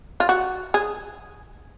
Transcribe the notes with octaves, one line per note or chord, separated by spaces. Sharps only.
F4
F#4
G#4